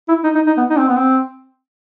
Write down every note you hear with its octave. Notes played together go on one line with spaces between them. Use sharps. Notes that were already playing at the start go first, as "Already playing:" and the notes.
E4
D#4
D#4
D#4
B3
D#4
C4
B3
C4